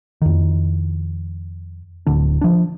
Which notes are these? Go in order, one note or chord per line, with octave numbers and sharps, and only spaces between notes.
F2 D#3
D1 D3 D4
F3 D4